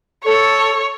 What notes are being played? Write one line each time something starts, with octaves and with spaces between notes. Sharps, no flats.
A4 C#5